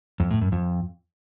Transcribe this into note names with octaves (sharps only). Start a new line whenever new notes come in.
F2
A2
F#2
F2